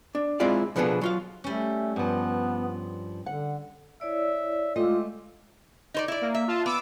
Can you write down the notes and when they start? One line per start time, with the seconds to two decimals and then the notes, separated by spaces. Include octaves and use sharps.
0.15 D4
0.40 G#3 C4 E4 F4 D5 F5
0.76 B2 F3 B3 D4 G#4 A4
1.01 F#3 F4 F5
1.44 G3 A3 C#4
1.96 G2 F3 B3
3.26 D3 F#5
4.01 E4 C#5 D5 E5
4.76 G#3 A3 C4 F4 D#5 D6
5.94 D#4 C5 D5
6.08 E4 D5
6.21 A#3
6.34 E5
6.48 F4 A5
6.66 B3 D6 E6